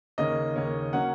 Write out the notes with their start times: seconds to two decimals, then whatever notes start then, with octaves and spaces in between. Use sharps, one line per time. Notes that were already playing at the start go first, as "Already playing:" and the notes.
0.18 D#2 C#3 A#3 C#4 D#5
0.55 D#2 C#3 A#3 C#4
0.93 F#3 A#3 C#4 F#5